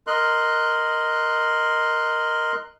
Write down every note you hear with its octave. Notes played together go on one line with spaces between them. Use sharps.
A#4 D#5 C6 F#6